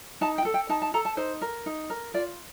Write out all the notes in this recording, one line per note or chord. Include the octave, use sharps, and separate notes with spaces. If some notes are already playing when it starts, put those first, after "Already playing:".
D#4 A5
G5
A4
G5
D#4 A5
A5
A4 A#5
A5
D#4 C5
A#4
D#4
A#4
F4 D5